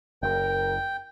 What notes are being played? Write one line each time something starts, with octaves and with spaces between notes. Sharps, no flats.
F#1 A#4 G5